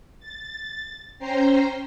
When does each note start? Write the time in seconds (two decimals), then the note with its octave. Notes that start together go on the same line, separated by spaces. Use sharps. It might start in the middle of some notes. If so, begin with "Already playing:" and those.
0.20 A6
1.19 C#4 C5 G5 A#5 C7